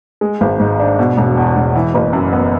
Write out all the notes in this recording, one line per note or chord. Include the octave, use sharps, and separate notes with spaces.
G#3
G#1
G#2
D4
B2
E1
E2
E1
E3
F#1
F#2
B3